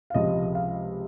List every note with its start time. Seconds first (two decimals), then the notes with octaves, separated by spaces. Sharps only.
0.10 F5
0.14 C#2 C3 F3 D#5
0.55 F5